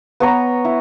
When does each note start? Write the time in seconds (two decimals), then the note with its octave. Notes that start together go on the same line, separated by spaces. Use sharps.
0.20 B3 C#5 A#5
0.65 E4